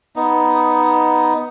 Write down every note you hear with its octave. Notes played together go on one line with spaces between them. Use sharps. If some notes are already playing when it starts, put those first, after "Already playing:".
B3 D#4